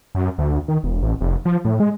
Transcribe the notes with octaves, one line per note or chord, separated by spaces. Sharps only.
F#2
D2
D#3
E1
A1
F1
F3
A2
G#3